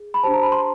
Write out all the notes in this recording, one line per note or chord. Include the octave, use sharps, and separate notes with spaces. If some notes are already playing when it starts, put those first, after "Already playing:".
Already playing: G#4
B5
D4 G4 C5 A5
A#5
B5
C6